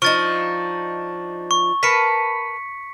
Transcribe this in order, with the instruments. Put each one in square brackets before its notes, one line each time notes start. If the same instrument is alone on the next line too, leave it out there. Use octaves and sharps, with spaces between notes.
[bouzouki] F3 D4 D#4 [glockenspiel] C#6 A6
[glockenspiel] C#6
[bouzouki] A#4 B4 A5 [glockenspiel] B6 C#7